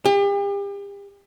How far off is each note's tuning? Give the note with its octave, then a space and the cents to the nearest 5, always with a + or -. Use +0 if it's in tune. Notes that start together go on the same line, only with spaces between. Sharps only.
G4 +40